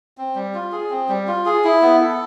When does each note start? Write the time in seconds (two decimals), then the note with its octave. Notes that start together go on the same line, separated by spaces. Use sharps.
0.18 C4
0.35 G3
0.54 F4
0.72 G#4
0.90 C4
1.09 G3
1.27 F4
1.46 G#4
1.64 E4
1.82 B3
2.00 A4